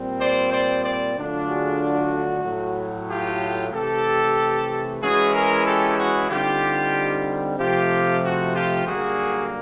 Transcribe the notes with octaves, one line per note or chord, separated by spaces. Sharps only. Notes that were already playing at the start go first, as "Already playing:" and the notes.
Already playing: A#2 G3 C4
C5 D5
C5 D5
C5 D5
D3 F#3 A3 D4 F4
F#4 G#4
F#4
A2 F#3 A3
F4 G4
C3 E3 A3 G4 A4
E3 G#3 C#4 E4 F#4 G#4
G#4 A#4
G4 A4
F#4 G#4
D3 G3 C4 D#4 F4 G4
C3 F3 A3 F4 G4
F#4
F4 G4
F#2 D3 G3 A#3 F#4 G#4